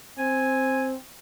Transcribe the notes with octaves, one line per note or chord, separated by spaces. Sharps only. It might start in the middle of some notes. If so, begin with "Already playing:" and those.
C4 G#5